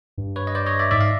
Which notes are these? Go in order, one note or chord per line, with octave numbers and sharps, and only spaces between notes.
G2
B4 C#5
D#5
C5 D5
C#5 D#5
D5 E5
G#2 D5 E5
D#5 F5